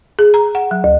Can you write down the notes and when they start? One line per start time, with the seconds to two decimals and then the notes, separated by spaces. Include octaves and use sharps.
0.19 G#4
0.34 A#5
0.55 F#5
0.71 F#3
0.84 D2